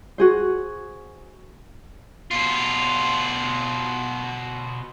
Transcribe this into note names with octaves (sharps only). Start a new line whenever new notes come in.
F#4 G#4 C5
B2 F4